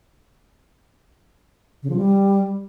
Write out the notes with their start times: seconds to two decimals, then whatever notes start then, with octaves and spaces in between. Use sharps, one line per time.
1.83 C#3
1.90 F3
1.96 G3